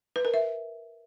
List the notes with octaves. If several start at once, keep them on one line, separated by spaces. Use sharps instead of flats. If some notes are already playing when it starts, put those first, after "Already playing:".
B4
A#4
E5